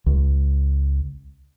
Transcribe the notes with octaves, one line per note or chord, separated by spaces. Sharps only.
C#2